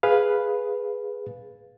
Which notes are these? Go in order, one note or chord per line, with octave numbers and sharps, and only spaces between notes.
G#4 B4 F5